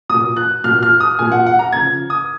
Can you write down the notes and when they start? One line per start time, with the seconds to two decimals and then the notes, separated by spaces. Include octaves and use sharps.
0.10 A#2 F#3 D#6
0.37 F#6
0.64 A#2 F#3 F6
0.83 F6
1.00 D#6
1.19 A#2 F#3 G#5
1.32 F#5
1.46 F#5
1.59 A#5
1.72 C#3 F3 G#6
2.10 D#6